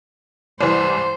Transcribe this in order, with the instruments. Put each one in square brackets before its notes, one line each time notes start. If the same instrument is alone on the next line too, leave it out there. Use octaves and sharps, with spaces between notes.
[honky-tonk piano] C2 E3 [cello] C5